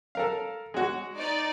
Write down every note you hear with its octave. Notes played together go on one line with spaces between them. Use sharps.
A4 A#4 F5
G#3 F#4
D#4 D5